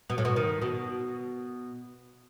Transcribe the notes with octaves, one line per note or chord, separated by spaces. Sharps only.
B2
A2
B2
D#3
B2